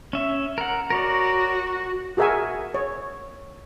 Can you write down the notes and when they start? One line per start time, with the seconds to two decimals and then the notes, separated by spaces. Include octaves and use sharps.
0.13 C#4 E5
0.58 A#4 F#5
0.90 F#4 A#4 C#5 D5
2.17 F#4 G#4 A#4 E5 F#5 G#5
2.74 C#5